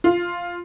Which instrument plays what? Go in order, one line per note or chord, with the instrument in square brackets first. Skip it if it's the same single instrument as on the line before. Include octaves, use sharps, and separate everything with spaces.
[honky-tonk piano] F4